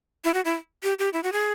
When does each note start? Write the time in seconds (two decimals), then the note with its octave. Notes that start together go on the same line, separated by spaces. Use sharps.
0.24 E4
0.34 F#4
0.45 E4
0.83 G4
0.99 G4
1.13 E4
1.23 F#4
1.32 G#4